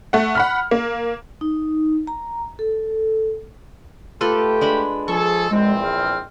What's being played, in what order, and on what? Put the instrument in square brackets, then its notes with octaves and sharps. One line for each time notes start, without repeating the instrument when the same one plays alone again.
[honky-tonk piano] A3 F#5
F#5 B5 F6
A#3
[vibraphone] D#4
A#5
A4
[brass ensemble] A3 G4 [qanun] F4 A4 B4
[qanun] G#3 D4 B5
[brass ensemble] F3 G#4 A4 [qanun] C#6
[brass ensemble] A#1 E2 C4 [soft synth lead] G#3
[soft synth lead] F6